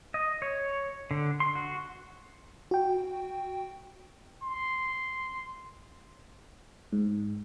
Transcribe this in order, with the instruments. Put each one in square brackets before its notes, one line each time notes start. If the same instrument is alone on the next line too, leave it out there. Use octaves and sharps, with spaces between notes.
[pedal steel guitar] D#5
C#5
D3
C6
F#4
[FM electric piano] F#4 G5
[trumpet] C6
[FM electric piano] G#2